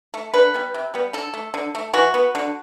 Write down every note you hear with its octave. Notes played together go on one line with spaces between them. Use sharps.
A3
D3 B4
G3 B3
C3
G3 B3
D3 A4
A3
D3
A3
E3 F#4
B3
D3